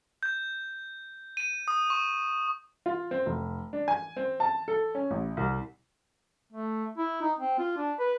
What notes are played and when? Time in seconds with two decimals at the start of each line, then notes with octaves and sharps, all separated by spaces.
0.23 G6
1.37 D#7
1.68 D#6
1.90 C#6
2.86 F4
3.11 C4
3.26 F1
3.73 D4
3.88 G#5
4.17 C4
4.40 A5
4.68 A4
4.95 C#4
5.11 A1
5.37 C2
6.52 A3
6.98 E4
7.21 D#4
7.39 C4
7.59 F4
7.77 D4
7.99 B4